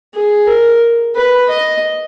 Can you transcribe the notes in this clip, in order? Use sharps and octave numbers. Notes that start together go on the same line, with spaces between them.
G#4
A#4
B4
D#5